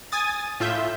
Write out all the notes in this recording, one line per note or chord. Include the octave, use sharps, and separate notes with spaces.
G#5 D#6 A6
A2 F4 E5 G6